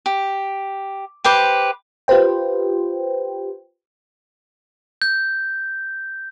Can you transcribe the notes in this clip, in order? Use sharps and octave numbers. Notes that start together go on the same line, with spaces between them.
G4
G4 B4 C5 D6
F4 G4 B4 C5 G5
G6